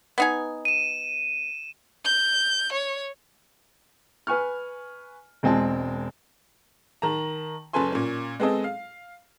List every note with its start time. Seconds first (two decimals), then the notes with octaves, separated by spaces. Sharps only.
0.18 B3 D#4 G#5
0.65 D#7 E7
2.05 G6
2.73 C#5
4.27 B4 G#5 C#6 F6
5.43 E1 G#3 C4 G#5 A5
7.02 D#3 A5 A#5
7.73 F#1 C#4 A4 B4 G#5 C6
7.92 A#2 C#4
8.40 G#3 B3 C4 G#4 A4 D#5
8.64 F5